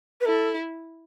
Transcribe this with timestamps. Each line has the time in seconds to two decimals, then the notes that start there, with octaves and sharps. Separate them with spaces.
0.21 B4
0.25 E4 A4